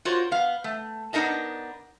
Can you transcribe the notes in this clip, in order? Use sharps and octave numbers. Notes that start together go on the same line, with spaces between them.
F4 F#4 A#4 C5 C#5
B3 F5
A3
B3 D4 D#4 A#4 D#5 A5